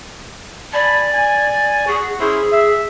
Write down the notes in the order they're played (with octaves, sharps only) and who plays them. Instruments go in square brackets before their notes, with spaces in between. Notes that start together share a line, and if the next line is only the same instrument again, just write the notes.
[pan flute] D5 [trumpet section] G#5 A5 B5
[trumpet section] G#5
[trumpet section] F#4 [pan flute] G#4
[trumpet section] C#4 E4 C5 [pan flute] G#4
[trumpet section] E5